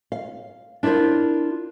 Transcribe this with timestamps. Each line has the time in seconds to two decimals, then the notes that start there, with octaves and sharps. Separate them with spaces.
0.12 F5
0.83 D4 E4 F4 A#4 C5